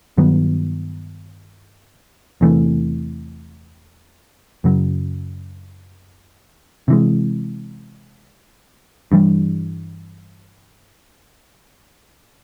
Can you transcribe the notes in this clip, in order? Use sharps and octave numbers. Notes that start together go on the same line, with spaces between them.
G2 D#3 F#3 B3
E2 C3 E3 A3
F#2 C#3 F#3
C3 E3 G#3
G2 E3 G3